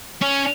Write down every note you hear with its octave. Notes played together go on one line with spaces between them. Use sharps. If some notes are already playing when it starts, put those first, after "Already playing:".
C#4